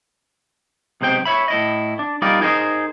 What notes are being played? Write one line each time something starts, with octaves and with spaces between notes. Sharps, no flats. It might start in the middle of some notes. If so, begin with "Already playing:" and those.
B1 C3 G#3 C5 G5
C#5 E5 B5
A2 E4 D#5
D4
G3 D#4 F4 A#4 D5
D#4 G#4 A#4 C5